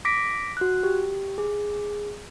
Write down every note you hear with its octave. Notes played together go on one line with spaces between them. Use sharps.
D6 A#6 B6 D7
F#4 F#6
G4
G#4